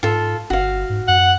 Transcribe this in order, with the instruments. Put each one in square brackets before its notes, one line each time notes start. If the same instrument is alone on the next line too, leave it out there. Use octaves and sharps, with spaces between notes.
[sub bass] G#2 [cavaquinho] F4 A4
[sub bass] G1 [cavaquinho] F#4 F5
[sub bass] G#2
[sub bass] F#2 [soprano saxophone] F#5